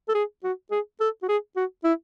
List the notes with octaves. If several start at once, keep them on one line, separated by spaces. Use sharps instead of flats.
A4
G#4
F#4
G#4
A4
F#4
G#4
F#4
E4